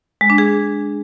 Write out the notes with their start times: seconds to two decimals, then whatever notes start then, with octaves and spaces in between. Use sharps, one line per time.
0.21 G#3
0.30 D4
0.38 G#4